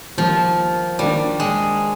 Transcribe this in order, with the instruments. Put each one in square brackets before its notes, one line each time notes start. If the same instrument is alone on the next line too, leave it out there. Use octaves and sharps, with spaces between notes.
[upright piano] D#3 G3 A#3 [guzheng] F3
[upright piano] D#3 A#3 D4 [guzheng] G3
[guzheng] G#3